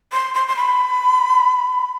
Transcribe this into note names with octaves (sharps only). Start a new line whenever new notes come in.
C6
C6
C6
B5